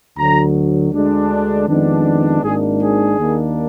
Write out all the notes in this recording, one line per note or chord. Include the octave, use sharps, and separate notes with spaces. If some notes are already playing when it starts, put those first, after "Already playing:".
D2 D3 F#3 A#5
D2 D3 G#3 D4
F2 D#3 G#3 B3 D4
G#1 G#2 D#3 A#3 D4 G#4
G#4
D#2 D#3 A#3 D4